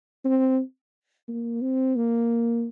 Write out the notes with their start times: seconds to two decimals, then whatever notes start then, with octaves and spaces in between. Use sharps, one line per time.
0.25 C4
1.28 A#3
1.61 C4
1.96 A#3